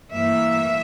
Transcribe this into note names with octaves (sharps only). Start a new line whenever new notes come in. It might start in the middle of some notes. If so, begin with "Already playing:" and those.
G2 E3 A#3 E5